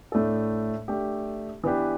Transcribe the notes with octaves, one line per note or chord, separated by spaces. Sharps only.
A2 A3 D4 A4
A3 D4 G4
E3 B3 D4 G4 B4